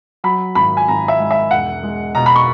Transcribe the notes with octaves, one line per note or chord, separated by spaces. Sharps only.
F#3 B5
G#1 B5
G#5
G#1 A#5
E5
G#2
E5
E1 F#5
G#3
B2 A#5
B5
C#6